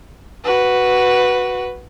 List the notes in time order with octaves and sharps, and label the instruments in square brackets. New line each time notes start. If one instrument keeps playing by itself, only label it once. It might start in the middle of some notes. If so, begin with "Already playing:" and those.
[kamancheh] F#4 B4